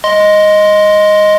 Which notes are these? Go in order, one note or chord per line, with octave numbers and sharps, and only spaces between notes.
D#5 C6